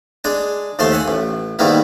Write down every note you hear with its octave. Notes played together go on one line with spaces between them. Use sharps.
G#3 D4 G#5
D#2 F3 A3 A5 C6
E5 F#5 G#5
A1
G#2 D#3 G3 A#3 B3 E4